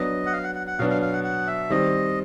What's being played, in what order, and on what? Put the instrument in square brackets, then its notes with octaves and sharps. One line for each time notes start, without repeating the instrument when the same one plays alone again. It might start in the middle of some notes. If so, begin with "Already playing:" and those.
Already playing: [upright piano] F#3 B3 D4 [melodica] D#5
[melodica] F#5
F5
F#5
F#5
F#5
[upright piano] B2 F#3 B3 D4 [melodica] F5
[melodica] F5
F5
F#5
F#5
E5
[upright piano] D#3 G3 C4 [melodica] D#5